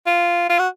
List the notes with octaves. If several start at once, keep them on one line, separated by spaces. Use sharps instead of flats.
F4
F4
F#4